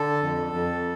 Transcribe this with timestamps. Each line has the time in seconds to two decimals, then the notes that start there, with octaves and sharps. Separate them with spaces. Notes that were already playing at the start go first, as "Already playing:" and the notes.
Already playing: D3 A4
0.23 F2
0.53 F2